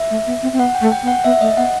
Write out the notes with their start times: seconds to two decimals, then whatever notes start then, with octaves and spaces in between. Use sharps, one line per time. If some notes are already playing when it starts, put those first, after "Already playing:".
Already playing: E5
0.10 A3
0.27 B3
0.43 C4
0.53 C4
0.59 B3 F#5
0.75 G5
0.81 A3
0.92 G5
1.03 B3
1.08 F#5
1.24 B3 E5
1.41 A3 D#5
1.57 B3 F#5